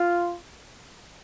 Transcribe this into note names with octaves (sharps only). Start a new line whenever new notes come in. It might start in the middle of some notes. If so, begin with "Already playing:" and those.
Already playing: F4